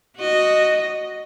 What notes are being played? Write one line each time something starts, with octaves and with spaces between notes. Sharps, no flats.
F#4 D#5